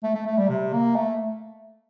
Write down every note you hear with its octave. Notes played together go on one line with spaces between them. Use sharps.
A3
A3
A3
G3
C3
A#3
A3